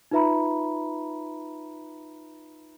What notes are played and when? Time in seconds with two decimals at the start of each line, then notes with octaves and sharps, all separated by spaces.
0.11 D#4 F4 B4 E5 A#5 B5